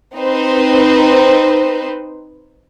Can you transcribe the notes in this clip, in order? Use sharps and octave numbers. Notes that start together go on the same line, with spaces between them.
C4 D#4 B4 C5